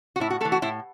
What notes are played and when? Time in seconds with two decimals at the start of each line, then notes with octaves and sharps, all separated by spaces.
0.16 F#4
0.20 A2 E4
0.30 F#4
0.41 A3 A4
0.45 E3
0.52 F#4
0.62 A2 E4